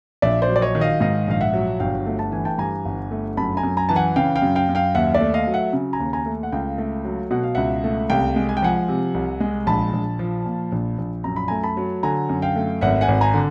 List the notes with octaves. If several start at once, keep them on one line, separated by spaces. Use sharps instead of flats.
A#1 D5 E5
C5 D5
F#3
D5
C#5 D#5
D#3
D#5 F5
G#2 D#5 F5
A#1 F5
E5 F#5
F#3
G1 F5 G5
A3
A5
E3 G#5
G5 A5
G2 G#5 A#5
G1
A3
F#2 A5 B5
G#5 A#5
F#2
G#5 A#5
E3 A5
F#5 G#5
C#3 F5 G5
F5 G5
F#2
F5 G5
F#2
F5 G5
D#2 E5 F#5
D5 E5
A3
D#5 F5
F#3
E5 F#5
C#3
G#5 A#5
D#2
G#5 A#5
A3
F#5
C#2 F5 G5
A3
F#3
B2 F#5
F5
C#2 E5 F#5
A3
C2 F5 G5
G#3
G#5
G5
F3 F#5 G#5
C3
C2
G#3
A#1 A5 B5
A#1
F3
A#2
A#1
A#1
F#2 A#5
B5
A3 G#5 A#5
A5 B5
F#3
D3 G#5 A#5
F#2
F5 G5
A3
G#1 E5 F#5
F#5 G#5
G#1
G#5 A#5
D3